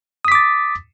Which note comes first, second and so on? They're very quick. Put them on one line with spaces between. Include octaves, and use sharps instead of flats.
D#6 B6 D6 A6